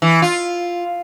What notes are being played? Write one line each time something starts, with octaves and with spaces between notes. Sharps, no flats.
E3
F4